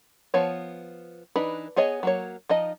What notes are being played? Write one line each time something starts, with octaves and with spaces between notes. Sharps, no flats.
F3 B3 C#5
E3 D4 D#4 B4 B5
B3 G#4 C#5 D#5 G#5
F#3 A#3 C#5
F3 D#4 D#5